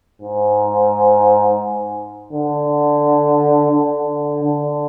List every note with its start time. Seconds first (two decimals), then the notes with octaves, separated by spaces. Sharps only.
0.22 G#2
2.33 D3
3.72 D3
4.43 D3